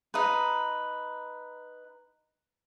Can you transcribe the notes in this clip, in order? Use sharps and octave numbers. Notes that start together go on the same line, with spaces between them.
D#4 B4